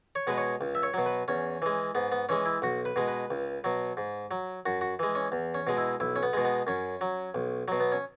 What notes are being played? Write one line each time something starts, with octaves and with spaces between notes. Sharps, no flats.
C#5
B2 G#3 B4
C#5
C#2
E5
C#5
B2 F#3
B4
E2 C#4
E3 G#3
G#2 B3
B3
E3 G#3 C#4
E4
B1 F#4
B4
B2 G#3
B4
C#2
B2 F#3
G#2
F#3
F#2 F#4
F#4
E3 G#3
C#4
E2
C#4
B2 G#3
E4
B1 E4
C#4
B3
B2 G#3
B3
F#2 C#4
F#3
B1
B2 F#3
B3
C#4